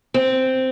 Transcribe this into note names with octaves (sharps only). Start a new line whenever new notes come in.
C4